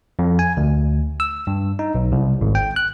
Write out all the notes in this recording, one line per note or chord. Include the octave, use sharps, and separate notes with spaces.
F2
G#5
D2
E6
G2
D#4
B1
C2
G#1
G5
F#6